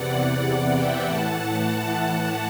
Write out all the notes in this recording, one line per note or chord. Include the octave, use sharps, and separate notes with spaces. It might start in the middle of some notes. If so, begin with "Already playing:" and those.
Already playing: E2 C3 E3 D5 F#5
D5 F#5
E5 G5
A2 E3 F#5 A5
F#5 A5
F#5 A5